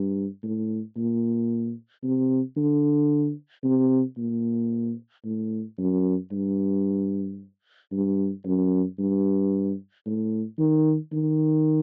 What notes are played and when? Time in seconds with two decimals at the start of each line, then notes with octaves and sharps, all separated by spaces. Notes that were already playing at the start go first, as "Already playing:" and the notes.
Already playing: G2
0.43 A2
0.97 A#2
2.03 C3
2.57 D3
3.64 C3
4.18 A#2
5.25 A2
5.78 F#2
6.32 G2
7.92 G2
8.46 F#2
8.99 G2
10.06 A2
10.59 D#3
11.13 D#3